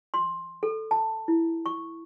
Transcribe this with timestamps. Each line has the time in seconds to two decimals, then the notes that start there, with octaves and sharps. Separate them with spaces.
0.14 C6
0.63 A4
0.91 A5
1.28 E4
1.66 C#6